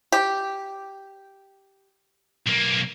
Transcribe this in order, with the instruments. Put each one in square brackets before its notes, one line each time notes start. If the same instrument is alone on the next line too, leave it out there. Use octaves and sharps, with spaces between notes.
[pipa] G4
[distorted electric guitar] B1 A#3